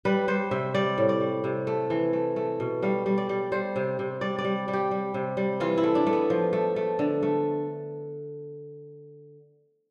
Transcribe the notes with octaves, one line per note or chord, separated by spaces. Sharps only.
G3 B4
G3 C5
C3 E5
G3 D5
A2
D5
G3
C3
A3
E3
A3
A3
B2
G3 F5
G3
D5
G3
G3 C5
C3
C3
G3 D5
D5
G3
G3
G4
G3
C3
G3
E3 F4
E4
A3
D4
A3
B3
F3
A3
A3
D3
A3